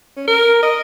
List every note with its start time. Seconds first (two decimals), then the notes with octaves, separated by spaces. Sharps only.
0.16 C#4
0.28 A#4
0.62 D#5